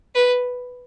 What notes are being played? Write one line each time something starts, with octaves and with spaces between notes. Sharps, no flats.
B4